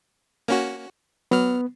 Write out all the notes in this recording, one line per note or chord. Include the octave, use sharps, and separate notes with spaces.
A#3 C#4 F#4
F#3 B3 F6